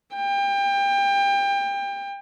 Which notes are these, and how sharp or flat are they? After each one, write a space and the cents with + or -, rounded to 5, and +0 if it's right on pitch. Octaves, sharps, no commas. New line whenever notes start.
G5 +30